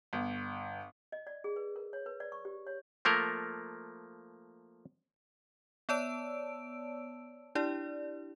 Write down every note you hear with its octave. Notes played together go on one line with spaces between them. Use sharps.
G1
D#5
D5
G#4
B4
A#4
C#5
B4
D5
C#6
G4
C#5
F3 A3 A#3 A#4
B3 C#5 D5 A5 E6 D7
D4 E4 G4 D5